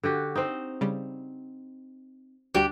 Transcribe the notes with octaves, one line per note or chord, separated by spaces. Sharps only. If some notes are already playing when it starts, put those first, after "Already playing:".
D3 F#4 G4
C4 D#4
C#3 G3
D2 G3 D4 F#4 G4